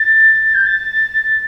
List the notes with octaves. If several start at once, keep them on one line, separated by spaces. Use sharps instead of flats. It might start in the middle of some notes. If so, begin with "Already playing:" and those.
Already playing: A6
G6
A6